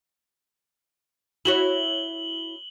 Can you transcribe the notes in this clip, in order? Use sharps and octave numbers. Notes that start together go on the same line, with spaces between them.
E4 F#4 C#5 F#7 G7